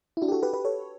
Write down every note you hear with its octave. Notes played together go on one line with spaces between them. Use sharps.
E4
D4 F#4
G4
F#4 A4
G4 B4
G4 B4
A4 C#5